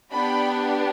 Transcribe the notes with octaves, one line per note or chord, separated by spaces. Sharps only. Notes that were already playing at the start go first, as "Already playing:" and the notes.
B3 D4 G4 G5 B5